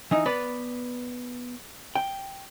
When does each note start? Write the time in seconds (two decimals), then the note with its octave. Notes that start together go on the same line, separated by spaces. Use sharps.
0.11 E3 D#4
0.26 B3 B4 D5
1.95 G5